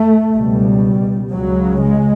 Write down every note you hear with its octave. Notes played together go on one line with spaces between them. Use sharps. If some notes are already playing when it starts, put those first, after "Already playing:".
Already playing: A3
C#2 B2 G3
C#2 C#3 F#3
G#3